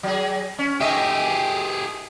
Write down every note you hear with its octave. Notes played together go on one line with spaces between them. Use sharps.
F#3 G#4
C#4
D#4 G4 G#4 D#5 E5